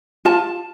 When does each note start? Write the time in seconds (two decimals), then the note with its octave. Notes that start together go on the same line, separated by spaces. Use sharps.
0.25 F4 A5